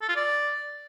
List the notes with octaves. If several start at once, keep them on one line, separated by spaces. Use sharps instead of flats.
A4
F4
D5